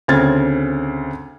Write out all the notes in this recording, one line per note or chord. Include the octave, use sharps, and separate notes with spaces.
D2 C#3 C4 F6 G#6 A6